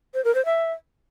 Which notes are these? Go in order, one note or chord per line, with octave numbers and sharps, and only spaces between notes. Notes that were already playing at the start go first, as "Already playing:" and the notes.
C5
A#4
C5
E5